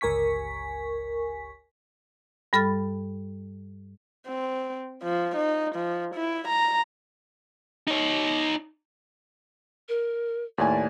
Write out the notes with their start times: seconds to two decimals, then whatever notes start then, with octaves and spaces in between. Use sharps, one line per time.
0.01 G1 C#2 A#4 G#5 C#6 B6
2.53 G2 G3 A4 B5 F6 A6
4.27 C4
5.03 F3
5.36 D#4
5.75 F3
6.15 E4
6.48 A#5
7.88 D#4 C#5
9.89 A#4
10.58 D#2 A2 D5 G#5